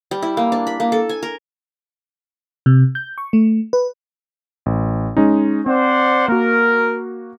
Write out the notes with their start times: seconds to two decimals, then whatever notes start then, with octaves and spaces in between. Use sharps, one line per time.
0.11 G3
0.22 E4
0.37 A#3
0.52 D4
0.67 B5
0.80 A#3
0.92 A4
1.09 G#5
1.23 A#4
2.66 C3
2.95 G6
3.18 C#6
3.33 A3
3.73 B4
4.66 A1
5.17 G#3 C#4 D#4
5.66 C4 C5 D5 F#5
6.28 A#3 F#4 A#4